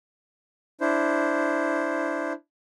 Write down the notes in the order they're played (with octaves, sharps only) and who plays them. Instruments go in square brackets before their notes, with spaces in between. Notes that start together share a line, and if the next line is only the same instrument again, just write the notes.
[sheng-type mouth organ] D4 E4 C5